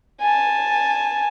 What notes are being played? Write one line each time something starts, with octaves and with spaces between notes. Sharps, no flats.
G#5 A5